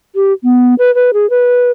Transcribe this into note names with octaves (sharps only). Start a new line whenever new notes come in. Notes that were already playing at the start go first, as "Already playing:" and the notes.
G4
B3
B4
B4
G#4
B4